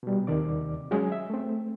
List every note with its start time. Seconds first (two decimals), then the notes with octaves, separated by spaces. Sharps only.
0.03 B2 G3
0.27 D#2 C3 D#3 D5 D6
0.91 F#3 G#3 C#4 G#4
1.12 E5
1.30 A3 C4